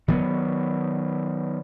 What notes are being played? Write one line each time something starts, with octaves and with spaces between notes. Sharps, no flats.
D#3 F#3 B3